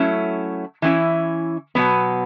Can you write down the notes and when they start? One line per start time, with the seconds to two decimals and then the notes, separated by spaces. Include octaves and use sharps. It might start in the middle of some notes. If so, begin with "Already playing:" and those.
Already playing: F#3 A3 C#4 E4
0.82 E3 C#4 E4
1.75 B2 F#3 B3